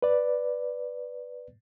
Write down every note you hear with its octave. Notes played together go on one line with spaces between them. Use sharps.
B4 D5